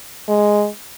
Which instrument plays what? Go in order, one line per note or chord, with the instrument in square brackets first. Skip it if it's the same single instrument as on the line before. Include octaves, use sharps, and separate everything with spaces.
[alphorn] G#3